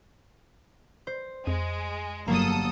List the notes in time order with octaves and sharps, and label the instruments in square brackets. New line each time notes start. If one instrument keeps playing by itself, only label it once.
[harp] C5
[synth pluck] F2 [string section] G#3
[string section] G1 A4 D#6 [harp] F#3 A#3